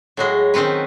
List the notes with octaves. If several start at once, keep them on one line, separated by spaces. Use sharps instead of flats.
A2 F#3 G#3
D#3 F#3 C4 C#4 B4